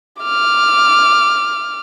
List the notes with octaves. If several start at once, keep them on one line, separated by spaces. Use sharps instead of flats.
D6 F6